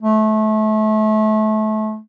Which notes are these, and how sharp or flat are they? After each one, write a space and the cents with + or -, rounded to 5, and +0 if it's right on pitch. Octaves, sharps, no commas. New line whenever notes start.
A3 -30